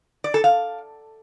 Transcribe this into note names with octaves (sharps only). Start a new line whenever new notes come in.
D5
A4
F5